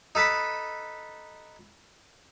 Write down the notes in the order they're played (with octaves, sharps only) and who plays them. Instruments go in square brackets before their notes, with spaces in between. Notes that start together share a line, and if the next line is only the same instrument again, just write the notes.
[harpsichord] D#4 A4 B4 A5 B5